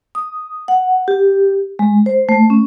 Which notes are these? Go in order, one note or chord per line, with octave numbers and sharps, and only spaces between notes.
D#6
F#5
G4
G#3
C5
A3
C#4